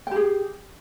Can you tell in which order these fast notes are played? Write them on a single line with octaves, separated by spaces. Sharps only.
G5 G4 G#4